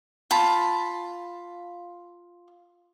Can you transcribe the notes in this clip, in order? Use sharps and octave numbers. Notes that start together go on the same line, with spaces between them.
F4 A5 B5